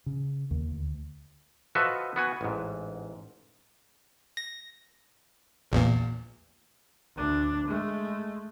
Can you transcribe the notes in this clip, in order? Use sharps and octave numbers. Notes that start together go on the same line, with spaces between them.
C#3
D#2
D2
F3 F#4 A4 B4 D#5 E5
B3 F#4 G#5
A1 G#2
A#6
A#1 E2 A#2
D2 D4
G#3 A3